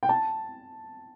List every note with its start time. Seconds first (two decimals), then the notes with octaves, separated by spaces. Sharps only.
0.03 G5
0.09 A5